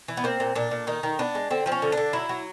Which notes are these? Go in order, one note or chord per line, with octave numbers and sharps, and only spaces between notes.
E3
B3
A#3 C4
A#2
A#2 D4
A#2
D#3 D#4
D#3
B3 D4
G#3
D3 C4
F3 C4
C#4
D3
D4
D3
F#3 E4
F#3